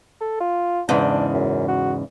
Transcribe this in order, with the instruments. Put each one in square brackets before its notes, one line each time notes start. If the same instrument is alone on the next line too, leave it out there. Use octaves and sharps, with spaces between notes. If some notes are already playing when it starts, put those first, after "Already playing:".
[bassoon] A4
F4
[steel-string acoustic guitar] E2 G#2 C#3 [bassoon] D4
[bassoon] F#2
F#4